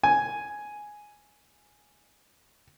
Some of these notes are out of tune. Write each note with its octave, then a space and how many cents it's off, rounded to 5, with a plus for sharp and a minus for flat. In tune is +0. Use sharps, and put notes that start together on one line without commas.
G#5 +5